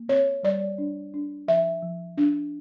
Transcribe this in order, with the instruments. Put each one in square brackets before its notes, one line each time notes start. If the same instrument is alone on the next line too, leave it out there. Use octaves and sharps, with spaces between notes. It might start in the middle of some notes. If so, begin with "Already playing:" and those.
Already playing: [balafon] A#3
C4 C#5
G3 D5
D4
D4
F3 E5
F3
D4